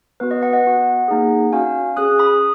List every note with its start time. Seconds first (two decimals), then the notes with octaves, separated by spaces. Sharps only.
0.20 B3 F#4 B4
0.31 B4 D#5
0.42 D#5 F#5
0.53 D#5 F#5
0.65 B3 F#4
1.08 A#3 D#4 G#4
1.53 C#4 F#4 F5 G#5
1.97 C#4 G#4 D#6 F#6
2.19 B5 D#6